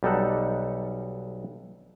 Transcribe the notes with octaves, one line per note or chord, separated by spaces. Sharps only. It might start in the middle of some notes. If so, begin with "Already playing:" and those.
B1 G3 D#4 A4 F#5